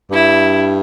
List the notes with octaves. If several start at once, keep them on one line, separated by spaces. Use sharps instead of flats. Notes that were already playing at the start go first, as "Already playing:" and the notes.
G2 E4